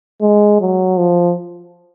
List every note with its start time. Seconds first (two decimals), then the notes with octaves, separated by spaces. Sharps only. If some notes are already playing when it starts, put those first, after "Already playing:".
0.21 G#3
0.61 F#3
0.99 F3